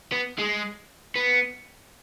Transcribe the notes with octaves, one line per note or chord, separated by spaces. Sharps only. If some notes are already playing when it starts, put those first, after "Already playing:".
B3
G#3
B3